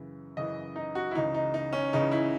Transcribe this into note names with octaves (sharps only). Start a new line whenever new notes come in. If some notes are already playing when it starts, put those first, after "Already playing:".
Already playing: F#2 C#3 E3
F#2 C#3 E3 D#5
D#4
F#4
E4
C#2 C#3 E3 D#4
D#4
D#4
C#4
C#2 C#3 E3 D#4
E4